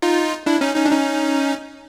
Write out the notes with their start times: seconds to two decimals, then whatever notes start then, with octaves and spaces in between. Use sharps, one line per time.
0.02 D#4 F4
0.46 D4 E4
0.61 C#4 D#4
0.76 C#4 D#4
0.86 D4
0.91 C#4 D#4